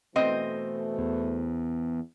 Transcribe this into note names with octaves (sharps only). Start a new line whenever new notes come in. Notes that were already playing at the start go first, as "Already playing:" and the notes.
B2 E3 A3 C4 C5 D#5
E2